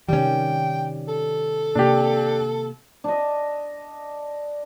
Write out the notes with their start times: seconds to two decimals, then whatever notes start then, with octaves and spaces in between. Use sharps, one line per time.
0.09 C3 D#3 G3 C#4 G5
1.08 A4
1.75 C3 A#3 D4 G4
3.04 D4 D#5